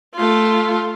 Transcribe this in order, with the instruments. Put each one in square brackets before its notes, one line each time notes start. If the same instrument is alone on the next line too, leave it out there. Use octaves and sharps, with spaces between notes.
[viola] A3 F4